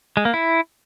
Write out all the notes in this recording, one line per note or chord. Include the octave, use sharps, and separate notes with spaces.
G#3
A#3
E4